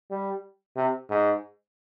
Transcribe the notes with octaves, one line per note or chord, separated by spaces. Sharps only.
G3
C3
G#2